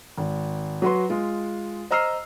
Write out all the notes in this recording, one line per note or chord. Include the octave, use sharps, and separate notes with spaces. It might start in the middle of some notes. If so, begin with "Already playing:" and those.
G#1
F#3 F#4 B4 C6
G#3 F4
C5 D#5 A#5 E6 F6 C7